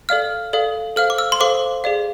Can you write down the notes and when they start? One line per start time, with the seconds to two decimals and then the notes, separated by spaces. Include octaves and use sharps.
0.09 A4 D5 F5 F6
0.53 A4 D5 F5
0.96 A4 C5 F5 F6
1.10 D6
1.18 E6
1.32 C6
1.40 A4 C5 F5 D6
1.84 G#4 D5 F5